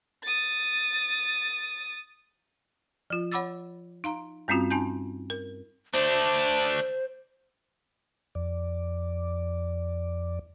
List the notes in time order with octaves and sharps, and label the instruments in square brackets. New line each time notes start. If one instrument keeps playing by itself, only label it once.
[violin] D#6 A6
[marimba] F3 F4
C#5 F#5 B5 D6 E6 A6
D#4 F5 A#5
G2 G3 C4 C#4 F4 F#4
C#4 D#4 G#5 A5 G6
A#4
[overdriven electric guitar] A3 D4 [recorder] C5
[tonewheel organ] F2 D5